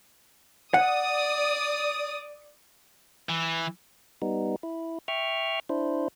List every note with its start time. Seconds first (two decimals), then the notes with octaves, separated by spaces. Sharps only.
0.74 D5 F#5 D#6
3.29 E3
4.22 G3 B3 D#4
4.63 E4
5.08 E5 G5 C#6 F6
5.69 D4 E4 C5